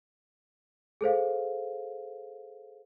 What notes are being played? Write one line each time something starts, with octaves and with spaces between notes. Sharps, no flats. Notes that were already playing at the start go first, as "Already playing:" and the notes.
G#4 A4 C5 F5